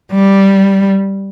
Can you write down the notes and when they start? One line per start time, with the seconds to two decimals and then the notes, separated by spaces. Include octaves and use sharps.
0.12 G3